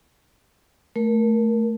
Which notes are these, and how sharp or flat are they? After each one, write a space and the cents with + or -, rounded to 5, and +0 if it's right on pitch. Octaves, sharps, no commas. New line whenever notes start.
A3 +0 A#4 +15